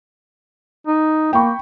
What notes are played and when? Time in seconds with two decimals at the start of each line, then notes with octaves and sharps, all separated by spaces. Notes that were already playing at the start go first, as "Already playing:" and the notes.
0.87 D#4
1.33 A#3 G5 B5 C#6